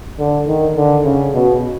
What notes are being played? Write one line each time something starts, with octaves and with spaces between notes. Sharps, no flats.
D3
D#3
D3
C#3
B2